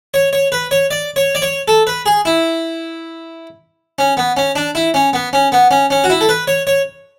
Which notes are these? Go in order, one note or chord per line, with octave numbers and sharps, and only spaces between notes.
C#5
C#5
B4
C#5
D5
C#5
D5
C#5
A4
B4
G#4
E4
C#4
B3
C#4
D4
E4
C#4
B3
C#4
B3
C#4
C#4
F#4
E4
A4
B4
C#5
C#5